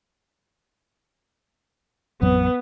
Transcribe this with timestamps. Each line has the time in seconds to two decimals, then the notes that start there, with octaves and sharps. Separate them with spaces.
2.22 A1 F2 F#3 B3